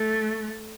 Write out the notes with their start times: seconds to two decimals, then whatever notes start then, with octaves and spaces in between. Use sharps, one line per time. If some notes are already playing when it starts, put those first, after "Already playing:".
Already playing: A3